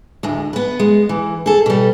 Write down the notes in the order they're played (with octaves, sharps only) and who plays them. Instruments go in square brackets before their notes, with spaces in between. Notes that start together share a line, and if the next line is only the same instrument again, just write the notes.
[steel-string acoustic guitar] D2 A2 G#3
B3 B4
G#3
E3
G#4 A4
B2 G3